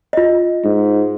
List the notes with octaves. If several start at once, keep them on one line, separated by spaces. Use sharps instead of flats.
F4 D#5
G#2